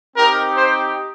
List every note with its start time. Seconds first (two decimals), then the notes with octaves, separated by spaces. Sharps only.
0.17 C4 D#4 G4 A#4
0.56 C5